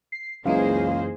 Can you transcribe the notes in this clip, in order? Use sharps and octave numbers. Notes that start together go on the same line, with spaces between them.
C7
C#2 F#2 E3 A#3 D#4 G#4 C5 F5